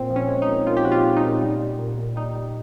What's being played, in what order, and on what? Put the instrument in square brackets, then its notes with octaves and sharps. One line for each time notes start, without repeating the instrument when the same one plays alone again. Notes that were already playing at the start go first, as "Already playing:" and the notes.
Already playing: [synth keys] A#2 C4
F3
C#4
G#3
D#4
A#2
A#2 F4
G4
F3 F#4
F4
G#3
D#4
A#2
G3
G3
A#2
A#2
G3 D#4
G3